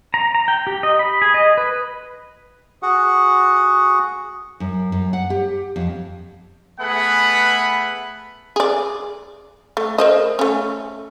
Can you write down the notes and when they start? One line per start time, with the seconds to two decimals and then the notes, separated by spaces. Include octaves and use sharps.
0.14 A#5
0.35 A#5
0.48 G5
0.67 G4
0.83 D#5
0.99 B5
1.22 G#4
1.34 D#5
1.57 B4
2.82 F#4 G#4 F#5
4.60 F#2
4.92 F#2
5.13 F#5
5.30 G4
5.76 F2
6.80 A3 B3 G#4 B4 F#5 B5
8.56 G#4 D5
9.77 A3
9.98 A#4 C5 D#5
10.39 A3 C#4